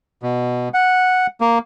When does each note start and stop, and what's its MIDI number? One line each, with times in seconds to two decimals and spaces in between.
0.23 0.69 47
0.74 1.27 78
1.41 1.59 58